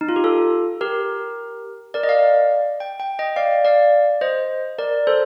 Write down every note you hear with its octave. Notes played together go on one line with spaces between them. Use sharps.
D#4
F4
G4
F4 A4
G4 A#4
A#4 D5
D#5
D5 F5
G5
G5
D#5 G5
D5 F5
D5 F5
C5 D#5
A#4 D5
A4 C5